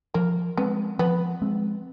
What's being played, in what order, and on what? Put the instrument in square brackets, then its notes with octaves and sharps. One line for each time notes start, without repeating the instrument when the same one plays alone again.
[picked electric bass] F3 [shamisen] A#3
[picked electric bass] G#3 C4 [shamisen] B3
[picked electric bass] F3 [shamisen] B3
[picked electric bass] G#3 C4